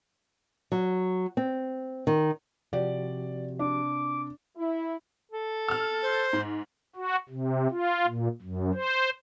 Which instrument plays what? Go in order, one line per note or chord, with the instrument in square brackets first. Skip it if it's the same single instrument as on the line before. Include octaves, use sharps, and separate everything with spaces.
[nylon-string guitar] F#3
C4
D#3
[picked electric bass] C3 [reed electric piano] F3 F#4 G4 [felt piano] D5
[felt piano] D4 [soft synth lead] D6
[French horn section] E4
[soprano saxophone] A4
[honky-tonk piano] E6 F6
[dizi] C5
[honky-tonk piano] G#2
[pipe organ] F#4
C3
F4
A#2
F#2
C5